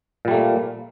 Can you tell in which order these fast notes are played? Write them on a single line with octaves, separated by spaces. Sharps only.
A#2 G3 A3 A#3